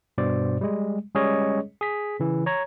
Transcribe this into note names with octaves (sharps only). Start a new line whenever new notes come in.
G2 B2 C5 D5
G3 G#3
G3 G#3 C#4 G#4 C#5 D#5
G#4 B6
C#3 E3
C#5 A#5 G#6